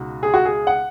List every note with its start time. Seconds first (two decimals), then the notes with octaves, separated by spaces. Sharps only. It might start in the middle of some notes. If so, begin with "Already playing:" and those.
Already playing: C#2 B2 G#3 D#4 F#4
0.23 G#4
0.34 F#4
0.45 G#4
0.67 F#5